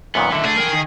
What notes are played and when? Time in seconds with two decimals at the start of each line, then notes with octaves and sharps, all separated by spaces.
0.15 F#2 A#2 D#3 B3 F#5
0.32 D3 D#3 E5 F#5
0.45 A3 G#4 D5
0.57 A#4 G5
0.73 D#3